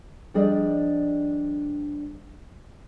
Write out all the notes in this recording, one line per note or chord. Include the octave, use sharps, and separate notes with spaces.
F3 G3 D4 G#4 D5 D#5